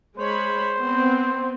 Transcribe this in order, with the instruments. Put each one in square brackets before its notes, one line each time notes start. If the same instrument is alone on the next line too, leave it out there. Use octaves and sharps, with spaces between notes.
[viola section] G#3 C#5 B5 [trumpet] C5
[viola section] B3 C4